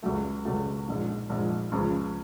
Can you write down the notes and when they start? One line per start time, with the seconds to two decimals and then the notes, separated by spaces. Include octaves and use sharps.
0.03 C#2 C#3 F#3 A3
0.45 C#2 C#3 F#3 A3
0.87 A#1 G#2 F3
1.30 A#1 G#2 F3
1.72 C#2 C#3 F3